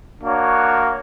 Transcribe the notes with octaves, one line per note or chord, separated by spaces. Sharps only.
A#3 D4 F#4 C#5